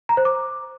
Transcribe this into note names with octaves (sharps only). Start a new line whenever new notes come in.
A#5
C5
D6